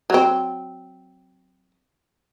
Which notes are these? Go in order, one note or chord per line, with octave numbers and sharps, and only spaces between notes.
F#3 C4